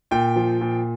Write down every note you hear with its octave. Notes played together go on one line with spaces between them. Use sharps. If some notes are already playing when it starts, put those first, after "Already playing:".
A#2 G5
F3
A#2